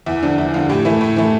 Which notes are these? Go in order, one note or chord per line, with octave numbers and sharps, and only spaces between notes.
E2 E4
D3 F3 D4
E2 E4
D3 F3 F4
A2 G4
E3 A3 E4
A2
E3 A3